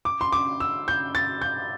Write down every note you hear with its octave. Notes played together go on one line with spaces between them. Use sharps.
D6
C6
D6
E6
G6
A6
G6